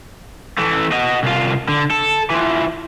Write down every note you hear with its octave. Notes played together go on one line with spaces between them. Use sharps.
E3 A3
F#4 D#5
C2 F4
D3
A4
E3 F3